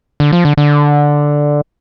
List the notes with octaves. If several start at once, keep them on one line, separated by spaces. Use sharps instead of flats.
D3
F3
D3
D3